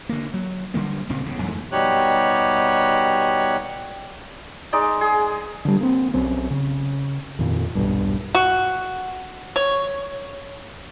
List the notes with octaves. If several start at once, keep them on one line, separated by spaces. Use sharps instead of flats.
D3 A#3
F#3
D3 G3 A#3
C#2 A#2 C#3 C4
G1 E2 C#3
F2 G#2 E3 A3
B2 G3 D#4 G4 C#5 F#6
G#3 D#4 D5 D6
G#4
D3 G3
A#3 C4
B1 C4 C#4
C#3
F2 A#2 D#3
D#1 B1 G2
F#4
C#5